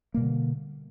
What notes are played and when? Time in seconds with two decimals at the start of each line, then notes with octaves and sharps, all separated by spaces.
0.14 A#3
0.17 B2
0.20 G3
0.23 D3